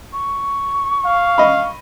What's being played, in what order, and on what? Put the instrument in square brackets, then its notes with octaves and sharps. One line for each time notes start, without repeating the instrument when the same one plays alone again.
[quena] C#6
[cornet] F5
[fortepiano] D#5 B5